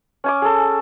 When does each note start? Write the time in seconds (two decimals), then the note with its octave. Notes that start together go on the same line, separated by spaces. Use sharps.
0.24 C#4 G#5 D6
0.42 G#4 A4